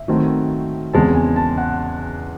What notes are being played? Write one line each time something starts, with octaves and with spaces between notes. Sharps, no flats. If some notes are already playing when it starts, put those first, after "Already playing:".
Already playing: E5
D#3 F#3 A3 C4
E2 C#3 G#3 C4 A5
G#5
A5
F#5